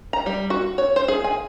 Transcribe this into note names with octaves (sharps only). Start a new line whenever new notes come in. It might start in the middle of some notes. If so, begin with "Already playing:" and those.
A#5
G3
F#4
C#5
C5
G#4
G#5